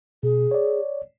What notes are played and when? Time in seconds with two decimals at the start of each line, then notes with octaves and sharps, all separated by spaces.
0.23 B2 G#4
0.51 C#5 D5